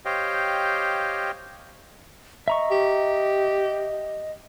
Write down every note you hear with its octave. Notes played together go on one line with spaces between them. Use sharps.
G4 C5 C#5 D#5 F5 G5
D#5 E5 A#5 C#6
G4